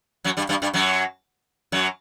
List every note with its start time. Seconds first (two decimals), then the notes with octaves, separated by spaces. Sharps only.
0.24 F#2 F#3
0.37 G2 G3
0.49 G2 G3
0.62 G2 G3
0.73 F#2 F#3
1.72 F#2 F#3